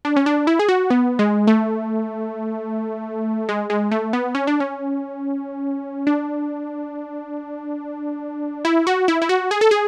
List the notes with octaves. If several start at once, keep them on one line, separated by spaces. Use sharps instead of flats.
D4
C#4
D4
E4
G#4
F#4
B3
G#3
A3
G#3
G#3
A3
B3
C#4
D4
C#4
D4
E4
F#4
E4
E4
F#4
G#4
A4
G#4